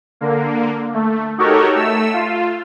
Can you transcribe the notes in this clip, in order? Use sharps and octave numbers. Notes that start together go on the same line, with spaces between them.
D3 A#3
A3
D#4 F#4 G4 A4 A#4 C#5
A3 E6
F4